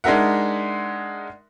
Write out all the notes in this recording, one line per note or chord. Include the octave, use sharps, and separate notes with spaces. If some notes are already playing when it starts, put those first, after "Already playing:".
G#3 D4 D#4 A#4 E5 F#5